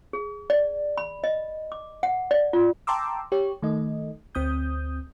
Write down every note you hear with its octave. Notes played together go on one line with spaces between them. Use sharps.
G#4
D5
B5
D#5
D6
F#5
D5
F4
G5 A5 A#5 C6 D6 E6
G4 C#5
D#3 A3 D#5
D2 C4 D#6 G6